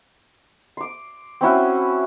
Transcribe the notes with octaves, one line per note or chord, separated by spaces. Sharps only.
C6 D6
C4 C#4 E4 F#4